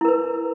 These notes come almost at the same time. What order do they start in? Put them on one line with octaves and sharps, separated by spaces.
E4 A#4 B4